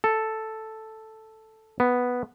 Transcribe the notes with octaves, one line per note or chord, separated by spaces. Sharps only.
A4
B3